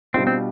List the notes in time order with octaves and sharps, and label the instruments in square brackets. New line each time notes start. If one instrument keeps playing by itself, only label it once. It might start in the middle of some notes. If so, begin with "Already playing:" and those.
[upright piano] B2 G3 D4 F4 [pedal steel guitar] C4
[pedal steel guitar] C4